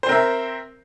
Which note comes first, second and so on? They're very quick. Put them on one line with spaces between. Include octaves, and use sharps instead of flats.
C5 C4 A#4 E5